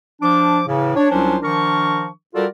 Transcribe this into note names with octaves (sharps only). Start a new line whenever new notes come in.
F3 D4 D6
A2 C#3 E3
D4 C#5
C2 F#3 C#4 D4 F4 C5
D#3 F3 D4 A#4 C#6
G3 F4 F#4 A4 A#4 D5